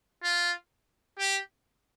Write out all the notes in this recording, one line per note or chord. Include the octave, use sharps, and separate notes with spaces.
F4
G4